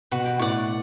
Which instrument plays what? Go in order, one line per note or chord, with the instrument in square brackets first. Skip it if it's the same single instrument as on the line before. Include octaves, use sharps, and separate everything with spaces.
[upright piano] B2 [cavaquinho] F#4 B4 F#5
[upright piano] A2 [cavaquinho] D5 F#5 C#6